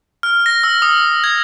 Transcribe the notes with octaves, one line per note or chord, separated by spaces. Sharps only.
F6
A#6
E6
D#6
G#6